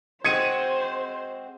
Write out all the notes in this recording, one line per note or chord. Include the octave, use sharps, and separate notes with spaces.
G#3 C4 F#4 C5 G#6 C#7 D#7